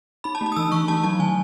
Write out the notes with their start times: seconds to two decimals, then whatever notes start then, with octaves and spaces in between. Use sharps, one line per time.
0.24 D#4 B5
0.35 A5
0.41 A3
0.46 A5
0.52 D#6
0.56 E3 E6
0.72 E3 C#6
0.88 A3 A5
1.03 F#3 A5
1.19 D#3 G#5